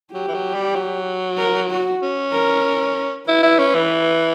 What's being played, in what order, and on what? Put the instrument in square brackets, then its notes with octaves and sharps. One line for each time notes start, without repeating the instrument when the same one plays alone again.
[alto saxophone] F#3 [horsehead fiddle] G4
[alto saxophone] E3
F#3
G3
F#3
[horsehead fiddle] A#4
F#4
[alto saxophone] C#4
[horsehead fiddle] A#4
[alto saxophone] E4 [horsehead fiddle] B4
[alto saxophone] E4
C#4
E3